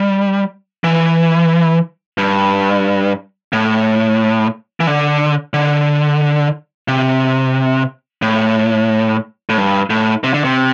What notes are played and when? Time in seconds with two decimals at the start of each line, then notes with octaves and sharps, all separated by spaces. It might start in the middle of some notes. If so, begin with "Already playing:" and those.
Already playing: G3
0.84 E3
2.18 G2
3.53 A2
4.80 E3
4.87 D3
5.54 D3
6.88 C3
8.22 A2
9.49 A2
9.57 G2
9.90 A2
10.24 C3
10.34 D3
10.44 C3